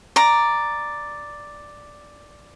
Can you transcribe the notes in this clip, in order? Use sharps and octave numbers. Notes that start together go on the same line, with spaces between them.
D5 A#5